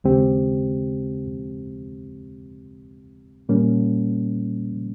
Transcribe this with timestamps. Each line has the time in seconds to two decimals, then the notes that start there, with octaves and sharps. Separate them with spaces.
0.04 D#2 C#3 G#3 C4 G4
3.49 A#2 G3 A#3 C#4